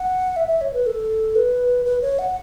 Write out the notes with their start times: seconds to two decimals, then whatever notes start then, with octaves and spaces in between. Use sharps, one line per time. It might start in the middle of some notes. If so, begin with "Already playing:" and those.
Already playing: F#5
0.36 E5
0.48 E5
0.61 C#5
0.73 B4
0.86 A4
1.35 B4
1.85 B4
2.02 C#5
2.19 F#5